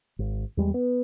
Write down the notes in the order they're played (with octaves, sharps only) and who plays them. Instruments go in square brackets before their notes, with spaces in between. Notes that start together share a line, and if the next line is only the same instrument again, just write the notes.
[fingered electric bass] G#1
E2 G3 G#3
B3